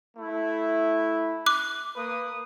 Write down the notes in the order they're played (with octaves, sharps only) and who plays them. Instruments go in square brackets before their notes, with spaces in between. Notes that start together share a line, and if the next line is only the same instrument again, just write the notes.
[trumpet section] A3 E4
[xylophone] D6 F#6
[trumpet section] A#3 B4 D#6